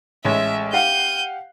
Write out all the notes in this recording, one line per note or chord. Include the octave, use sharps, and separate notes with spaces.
A1 G#3 C#5 E5
G4 F5 F#5 G6 D#7